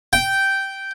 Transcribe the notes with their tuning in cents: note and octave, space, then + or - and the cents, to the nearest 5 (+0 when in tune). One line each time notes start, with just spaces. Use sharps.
G5 -10